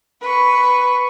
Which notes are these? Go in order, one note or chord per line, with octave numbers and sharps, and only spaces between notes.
B4 C#6